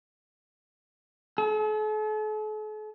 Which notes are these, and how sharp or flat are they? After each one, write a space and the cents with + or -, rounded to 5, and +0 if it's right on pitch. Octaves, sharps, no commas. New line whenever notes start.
A4 -45